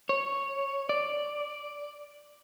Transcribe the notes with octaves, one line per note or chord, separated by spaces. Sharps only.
C#5
D5